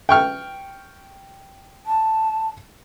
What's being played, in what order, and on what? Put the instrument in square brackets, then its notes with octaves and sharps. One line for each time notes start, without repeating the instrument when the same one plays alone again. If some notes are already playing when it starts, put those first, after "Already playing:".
[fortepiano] G5 C#6 F6
[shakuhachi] A5